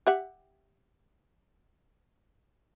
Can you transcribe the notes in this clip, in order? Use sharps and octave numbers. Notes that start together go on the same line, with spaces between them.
G4 E5 F#5